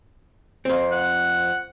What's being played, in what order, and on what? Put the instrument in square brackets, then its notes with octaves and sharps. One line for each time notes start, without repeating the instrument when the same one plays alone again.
[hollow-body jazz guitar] F2 C4
[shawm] F#5